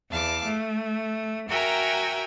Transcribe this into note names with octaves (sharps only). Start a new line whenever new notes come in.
E2 F5 A5 D6
A3
F#4 A#4 E5 G5 G#5 A#5